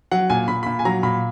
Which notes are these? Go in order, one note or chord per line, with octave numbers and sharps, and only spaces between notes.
F#3 F#5
A#2 G#5
A#2 B5
A#2 B5
G#5
F#3 A#5
A#2 B5